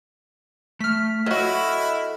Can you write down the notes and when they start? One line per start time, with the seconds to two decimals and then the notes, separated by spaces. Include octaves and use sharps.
0.80 A3 F6 B6
1.26 F#3 E4 F#4 A4 D#5